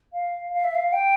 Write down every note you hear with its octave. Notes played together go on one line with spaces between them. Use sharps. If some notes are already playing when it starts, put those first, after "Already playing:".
F5
F5
E5
F5
G5